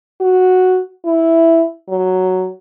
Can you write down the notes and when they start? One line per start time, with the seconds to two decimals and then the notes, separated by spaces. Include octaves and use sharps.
0.21 F#4
1.05 E4
1.88 F#3